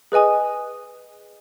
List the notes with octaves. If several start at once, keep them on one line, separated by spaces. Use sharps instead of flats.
G#4 B4 D#5 G#5 D#6